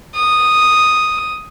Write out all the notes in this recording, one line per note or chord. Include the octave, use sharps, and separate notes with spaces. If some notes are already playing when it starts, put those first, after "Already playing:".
D#6